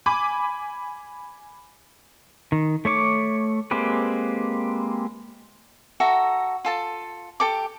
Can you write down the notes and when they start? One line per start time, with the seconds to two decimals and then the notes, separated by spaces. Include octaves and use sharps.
0.06 G#5 B5 D6
2.52 D#3
2.85 A3 C#5 C#6 D6
3.71 G#3 A#3 C4 G4 B4
6.00 F#4 A4 E5 A#5
6.65 F4 A4 A5
7.40 G4 A4 D6